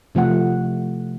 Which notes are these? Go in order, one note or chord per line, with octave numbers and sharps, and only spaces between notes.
C3 F3 A3 F#5